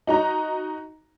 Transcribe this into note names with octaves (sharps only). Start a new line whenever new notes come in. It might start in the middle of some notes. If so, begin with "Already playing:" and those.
D#4 F#4 D#5 A#5